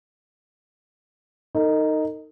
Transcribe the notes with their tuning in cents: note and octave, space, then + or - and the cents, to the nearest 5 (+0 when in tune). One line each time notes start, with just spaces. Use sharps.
D#4 +0 A#4 -45